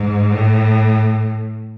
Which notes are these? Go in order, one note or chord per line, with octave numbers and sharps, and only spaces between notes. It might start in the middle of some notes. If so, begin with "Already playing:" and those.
Already playing: G#2
A2